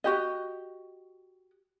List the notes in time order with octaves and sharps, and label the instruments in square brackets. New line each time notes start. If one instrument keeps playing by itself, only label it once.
[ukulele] F#4 G4 D#5